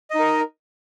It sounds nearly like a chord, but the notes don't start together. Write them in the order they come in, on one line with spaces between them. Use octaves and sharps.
D#5 D#4 A#4